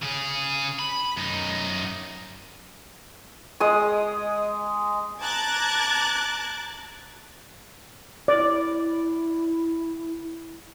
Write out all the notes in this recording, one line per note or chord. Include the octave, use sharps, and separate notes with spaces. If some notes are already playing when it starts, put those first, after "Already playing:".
C#3 G#4
B5
F#2 D#4
G#3 D#6
A5 A#5 D6 F#6 G#6 A6
E4 D5